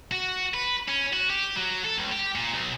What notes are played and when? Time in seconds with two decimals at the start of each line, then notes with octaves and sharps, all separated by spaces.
0.12 F#4
0.54 B4
0.88 C#4
1.13 F#4
1.30 G4
1.56 F#3
1.84 A4
1.98 C#2
2.12 G4
2.36 A#2
2.54 B1